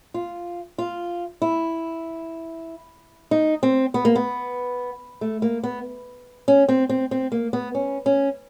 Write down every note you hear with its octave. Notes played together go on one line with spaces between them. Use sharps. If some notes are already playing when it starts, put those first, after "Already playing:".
F4
F4
E4
D#4
C4
B3
A#3
B3
A3
A#3
B3
C#4
C4
C4
C4
A#3
B3
C#4
C#4